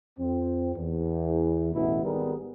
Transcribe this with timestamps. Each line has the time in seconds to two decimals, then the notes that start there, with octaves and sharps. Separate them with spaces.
0.18 F2 C4
0.76 E2
1.74 A1 D2 B2 E3 B3 E4
2.03 G#1 D#3 G3 B3 G#4 A#4